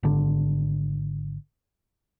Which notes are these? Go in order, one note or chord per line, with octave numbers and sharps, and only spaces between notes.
G#1 D3